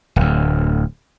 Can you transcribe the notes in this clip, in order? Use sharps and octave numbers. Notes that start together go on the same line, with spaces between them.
D1 D2